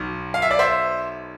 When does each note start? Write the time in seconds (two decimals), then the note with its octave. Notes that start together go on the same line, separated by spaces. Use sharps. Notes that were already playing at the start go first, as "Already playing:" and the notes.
Already playing: B1 B2
0.34 F5
0.42 E5
0.51 D5
0.59 C5 E5